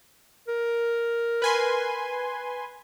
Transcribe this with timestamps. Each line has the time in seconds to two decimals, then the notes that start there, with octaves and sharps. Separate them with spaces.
0.48 A#4
1.42 B4 G#5 C6